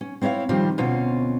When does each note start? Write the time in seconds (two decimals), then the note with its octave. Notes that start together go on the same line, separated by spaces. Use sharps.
0.01 C#4
0.21 C4 E4 C#5 D#5 F5
0.49 D#3 F3 G3 C4 D4 F4
0.78 D2 B2 C4 C#4 F4